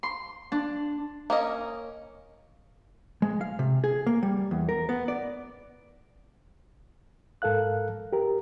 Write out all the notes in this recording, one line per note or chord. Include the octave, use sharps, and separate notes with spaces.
C6
D4
A#3 C#4 D#5
G#3
F5
C3
G#4
A#3
G3
E2
A#4
B3
D5
G#2 A4 A#4 F5 F#6
G4 A#4